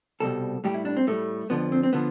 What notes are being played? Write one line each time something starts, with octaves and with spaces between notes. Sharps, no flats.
C2 B2 G3 A4
A2 G3 G4
E4
D4
C4
A2 G3 A3
F2 D3 F3 B3
C4
C4
D3 F3 B3